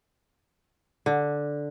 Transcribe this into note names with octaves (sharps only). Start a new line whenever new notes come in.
D3